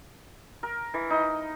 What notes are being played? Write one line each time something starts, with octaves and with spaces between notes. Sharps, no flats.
A#4
E3
D#4